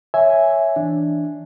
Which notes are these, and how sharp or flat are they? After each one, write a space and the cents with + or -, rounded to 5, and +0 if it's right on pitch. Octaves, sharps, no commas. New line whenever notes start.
C#5 +0 E5 +0 G#5 +0
E3 +0 D4 +0